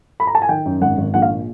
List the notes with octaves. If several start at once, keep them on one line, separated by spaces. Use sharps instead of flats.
B5
A#5
A5
G#5
D#3 G5
F#2
G#1 F#5
G#1
A#1 F#5
F5
A#2